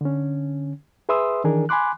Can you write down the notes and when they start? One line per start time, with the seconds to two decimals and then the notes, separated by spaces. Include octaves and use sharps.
0.01 D3 C#4
1.09 G#4 B4 E5 C6 D#6 E6
1.44 D#3 E3 D4 G#4 A#4
1.69 G#5 B5 C6 D6 F#6